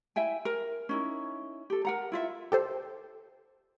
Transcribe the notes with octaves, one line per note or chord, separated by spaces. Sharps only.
E4 E5 G5 G#5
A#4
C#4 D#4 E4
G4 A4
A#4 F#5 A#5
E4 F4 E5
G4 A4 C5